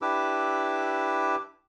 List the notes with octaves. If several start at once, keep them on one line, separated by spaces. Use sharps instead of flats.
D4 E4 G4 B4 D6 E6